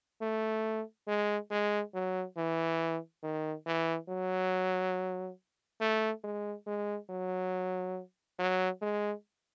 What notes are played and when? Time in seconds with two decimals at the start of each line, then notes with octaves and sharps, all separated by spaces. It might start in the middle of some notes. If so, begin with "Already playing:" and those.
0.22 A3
1.08 G#3
1.51 G#3
1.94 F#3
2.37 E3
3.23 D#3
3.66 E3
4.09 F#3
5.81 A3
6.24 G#3
6.67 G#3
7.10 F#3
8.39 F#3
8.82 G#3